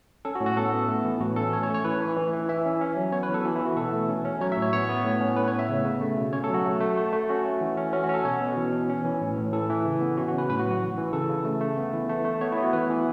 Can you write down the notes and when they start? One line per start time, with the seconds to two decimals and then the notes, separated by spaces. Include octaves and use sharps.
0.25 C#4 A4
0.35 F#4
0.41 A2
0.46 F#4
0.57 B3 A4
0.73 B3
0.88 A3
1.05 E3
1.20 A2 F#4
1.36 C#4 A4
1.52 C#4 C#5
1.63 C#5
1.69 A3
1.74 C#5
1.84 E3 B4
2.00 E3
2.17 E3
2.33 E3
2.49 E3 E5
2.65 C#4
2.81 C#4
2.97 F#3
3.12 B3 C#5
3.23 B4
3.29 E3 A4
3.44 E3 F#4
3.56 E4
3.61 E3 F#4
3.76 B2 A4
3.93 A3
4.09 C#4
4.25 C#4
4.41 F#3 C#5
4.52 E5
4.57 A2
4.62 C#5
4.73 B3 C#5
4.89 B3
5.05 A2
5.21 C#4
5.36 A2 B4
5.48 C#5
5.53 B3
5.59 E5
5.69 C#3
5.85 C#3
6.01 A3
6.17 B2
6.33 C#4 C#5
6.44 A4
6.49 F#3
6.54 F#4
6.65 A3
6.80 A3
6.97 A3
7.13 A3
7.29 C#4 F#4
7.46 A3
7.61 E3
7.77 C#4
7.93 C#4 F#4
8.04 F#4
8.09 C#4 A4
8.25 B2 C#5
8.41 B2
8.57 E3
8.73 C#4
8.89 C#4
9.05 E3
9.22 A2
9.37 A2
9.53 E3 A4
9.69 E3
9.85 C#3
10.01 B3
10.17 C#4 F#4
10.28 F#4
10.34 C#3 B4
10.50 A2 B4
10.60 F#4
10.65 F#3
10.71 F#4
10.82 E3
10.97 E3
11.13 C#3 A4
11.30 C#3
11.45 A3
11.61 A3
11.78 B3
11.93 E3
12.09 A3
12.25 A3
12.41 B3 C#5
12.52 E4
12.57 B3
12.63 F#4
12.73 E3 B4
12.89 E3